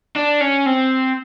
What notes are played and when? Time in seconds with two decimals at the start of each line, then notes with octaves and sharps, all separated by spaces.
0.16 D4
0.41 C#4
0.66 C4